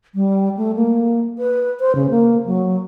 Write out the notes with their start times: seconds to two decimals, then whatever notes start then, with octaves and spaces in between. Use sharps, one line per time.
0.15 G3
0.57 A3
0.75 A#3
1.39 B4
1.80 C5
1.95 C#3
2.10 A#3
2.46 F#3